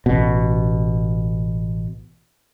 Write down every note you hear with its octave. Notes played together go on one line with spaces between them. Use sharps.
A1 B2